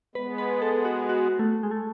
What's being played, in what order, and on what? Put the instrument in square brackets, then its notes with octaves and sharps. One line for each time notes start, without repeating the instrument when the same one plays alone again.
[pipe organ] G#3 B3 [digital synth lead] B4
[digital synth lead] B4
A4
F#4
F#4
A3
G#3
A3